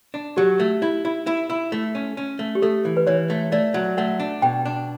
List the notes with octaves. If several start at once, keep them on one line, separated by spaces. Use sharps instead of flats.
D4
F#3 G4
A3
E4
E4
E4
E4
A3
C#4
C#4
A3
G4
A3 A4
E3
B4
E3 C#5
A3
A3 D5
F#3
A3 F#5
D4
B2 G5
D4